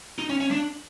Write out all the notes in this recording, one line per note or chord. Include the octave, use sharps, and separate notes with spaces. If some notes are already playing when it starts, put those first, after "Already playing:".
D#4
C#4
C#4
D4